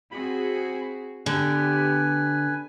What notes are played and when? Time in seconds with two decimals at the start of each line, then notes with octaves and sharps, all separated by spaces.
0.11 C4 F#4 G#4 B5
1.26 D3 B3 G4 B4 G#5